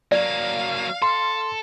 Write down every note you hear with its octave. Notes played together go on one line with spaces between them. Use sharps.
F#3 A#3 D5 F5
A4 C6